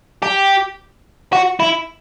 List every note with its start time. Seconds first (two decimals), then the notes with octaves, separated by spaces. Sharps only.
0.23 G4
1.33 F#4
1.60 E4